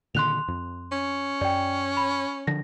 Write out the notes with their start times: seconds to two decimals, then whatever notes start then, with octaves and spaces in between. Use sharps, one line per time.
0.15 A#2 D3 D#3 C6 F#6 F7
0.48 F2
0.92 C#4
1.41 F#2 D5 G5
1.97 B5
2.47 D3 F3 A#6